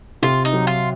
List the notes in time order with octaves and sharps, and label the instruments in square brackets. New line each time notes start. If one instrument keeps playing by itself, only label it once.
[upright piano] C3 [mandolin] F4
[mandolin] D#4
[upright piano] F#3
[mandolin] F4